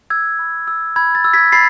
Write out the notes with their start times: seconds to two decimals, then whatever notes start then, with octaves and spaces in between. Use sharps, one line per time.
0.10 E6 G#6
0.39 B5
0.68 E6
0.96 B5 G#6
1.15 A6
1.24 E6
1.33 G#6 B6
1.52 B5 A6 C7